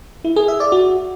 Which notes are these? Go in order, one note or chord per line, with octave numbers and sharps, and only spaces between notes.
E4
G#4
E5
D5
F#4